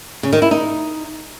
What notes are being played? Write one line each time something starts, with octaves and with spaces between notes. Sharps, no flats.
C#3
D#3
E4
D#4